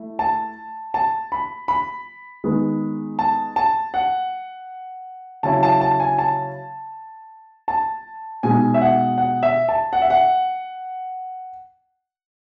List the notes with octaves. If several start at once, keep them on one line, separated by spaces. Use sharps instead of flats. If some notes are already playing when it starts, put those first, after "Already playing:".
Already playing: A3 E4
A5
A5
B5
B5
D#3 G#3 B3
A5
A5
F#5
C#3 F#3 C#4 E4 A5
A5
A5
G#5
A5
A5
B2 G#3 D#4 G#5
E5
F#5
F#5
E5
A5
F#5
E5
F#5